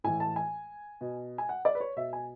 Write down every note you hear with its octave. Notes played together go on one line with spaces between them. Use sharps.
A2 E3 G#5
A5
G#5
B2
G#5
F#5
D5
B4
C#5
B2 E5
G#5